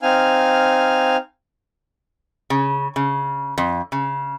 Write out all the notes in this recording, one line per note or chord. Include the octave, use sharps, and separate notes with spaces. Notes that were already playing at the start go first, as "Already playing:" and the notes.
C4 D#4 F5 G#5 F6
C#3
C#3
F2
C#3